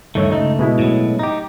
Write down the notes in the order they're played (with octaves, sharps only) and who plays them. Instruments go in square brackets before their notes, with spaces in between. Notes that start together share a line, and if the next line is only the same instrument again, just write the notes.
[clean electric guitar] D2 G2 D#3 [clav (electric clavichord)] A3 C#5 E5
[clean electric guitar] C#2 A3 [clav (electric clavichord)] D#4
[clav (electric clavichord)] B2 G#3 E4
[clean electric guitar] A2 F#3
D#4 G4